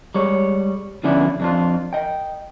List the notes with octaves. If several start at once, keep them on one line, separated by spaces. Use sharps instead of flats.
G3 G#3 C#5
D3 F3 B3 C#4 D4 E4
F2 D4 F4
D#5 G5